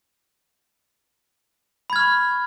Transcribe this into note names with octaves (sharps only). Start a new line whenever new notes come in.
B5 C#6 F6 G#6